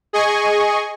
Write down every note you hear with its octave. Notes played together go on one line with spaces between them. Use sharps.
G#4 D#5 G#5 C#6